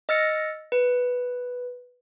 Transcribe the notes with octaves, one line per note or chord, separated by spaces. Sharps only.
D#5 E6 F6 A6 A#6 C#7
B4